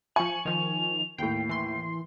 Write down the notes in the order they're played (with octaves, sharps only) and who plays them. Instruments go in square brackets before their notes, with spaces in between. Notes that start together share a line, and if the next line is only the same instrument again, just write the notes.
[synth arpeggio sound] F3 C#7 [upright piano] G#5 C#6 [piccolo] F#7
[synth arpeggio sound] D#3 F3 [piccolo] F7
[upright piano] D#2 A2 [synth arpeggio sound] G5 [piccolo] C7
[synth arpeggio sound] E3 C6